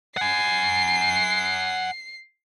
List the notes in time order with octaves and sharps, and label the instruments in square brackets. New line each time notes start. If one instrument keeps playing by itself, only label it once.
[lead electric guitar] F#5 G#5 [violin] C7